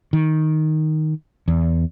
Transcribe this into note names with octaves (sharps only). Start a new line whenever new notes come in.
D#3
E2